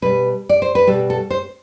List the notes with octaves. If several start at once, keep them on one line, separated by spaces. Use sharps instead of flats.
B2 G3 B4
D5
C5
B4
B2 G3 A4
A4
C5